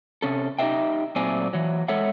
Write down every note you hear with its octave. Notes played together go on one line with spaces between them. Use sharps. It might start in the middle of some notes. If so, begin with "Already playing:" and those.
C3 C#4 A4
D#4 G4 G#4 D#5 E5 G5
A#2 F#3 A3 C4 D5 G#5
E3 F#3
G#3 A4 C#5 E5 F#5